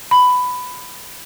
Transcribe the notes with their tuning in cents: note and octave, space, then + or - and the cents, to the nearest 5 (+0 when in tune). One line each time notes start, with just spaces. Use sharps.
B5 +10